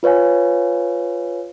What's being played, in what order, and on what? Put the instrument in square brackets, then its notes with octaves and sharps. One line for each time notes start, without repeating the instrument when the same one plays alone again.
[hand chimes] F4 B4 C#5 F5 G#5